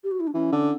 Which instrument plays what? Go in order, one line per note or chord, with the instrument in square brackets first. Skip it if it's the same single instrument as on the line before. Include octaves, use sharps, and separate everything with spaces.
[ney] G4
F#4
E4
D4
[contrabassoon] E3 [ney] C#4
[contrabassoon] D3